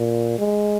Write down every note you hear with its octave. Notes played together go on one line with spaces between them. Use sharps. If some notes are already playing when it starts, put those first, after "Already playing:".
Already playing: A#2
G#3